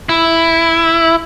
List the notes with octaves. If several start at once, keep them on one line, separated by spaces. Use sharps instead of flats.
E4